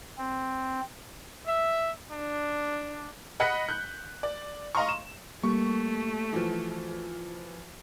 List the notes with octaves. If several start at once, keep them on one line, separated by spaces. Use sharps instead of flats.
C4
E5
D4
D#5 F#5 B5 F#6 B6 C#7
F#6 G6
D5
D#5 F5 A#5 C6 C#6
E7
G3 A3 A#3 G4 C#6
E3 F3 F#4